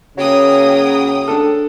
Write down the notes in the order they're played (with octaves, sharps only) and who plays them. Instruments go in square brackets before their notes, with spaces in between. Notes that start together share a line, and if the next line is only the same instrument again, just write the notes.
[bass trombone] C#3 [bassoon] F#3 [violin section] A#3 G5 D#6
[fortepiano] D4 A4